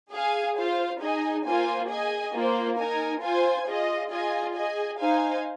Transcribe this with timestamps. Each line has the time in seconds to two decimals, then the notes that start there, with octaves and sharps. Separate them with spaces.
0.11 G#4 F5 G#5
0.56 F4 C5 F5
1.00 D#4 G#4 D#5 G#5
1.44 A#3 F4 C5 G#5
1.89 G#4 D#5 G#5
2.33 A#3 F4 C5
2.77 D#4 A#4 G#5
3.21 F4 C5 G#5
3.66 F4 G#4 D#5
4.11 F4 G#4 D#5 G#5
4.55 G#4 D#5 G#5
4.99 D#4 C5 F5 G#5